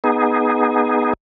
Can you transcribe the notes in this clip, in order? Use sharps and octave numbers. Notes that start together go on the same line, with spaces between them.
B3 D#4 G#4